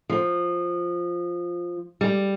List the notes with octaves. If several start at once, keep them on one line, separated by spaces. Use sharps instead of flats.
F3
G3